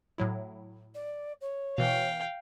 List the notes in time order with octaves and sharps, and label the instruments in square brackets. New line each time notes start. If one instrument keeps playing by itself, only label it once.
[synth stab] A2 F#3 E4
[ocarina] D5
C#5
[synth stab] B2 E3 [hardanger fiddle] F5 G5